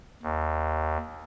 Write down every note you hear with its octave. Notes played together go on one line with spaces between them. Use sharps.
D#2